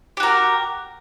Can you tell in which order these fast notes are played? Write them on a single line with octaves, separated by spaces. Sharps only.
G4 F#4 A#4